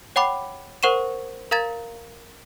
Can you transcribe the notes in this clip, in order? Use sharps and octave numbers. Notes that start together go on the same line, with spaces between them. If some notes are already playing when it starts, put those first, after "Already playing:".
C#5 F#5 G5 B5 D6
A#4 C5 F#5 C#6 D#7 E7
A#4 F5 A#5 G#6 A6